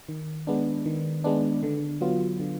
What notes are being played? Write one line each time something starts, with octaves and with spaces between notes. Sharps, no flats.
D#3
G#3 B3 D4
D#3
G#3 B3 D4
D3
F#3 B3 F4
D3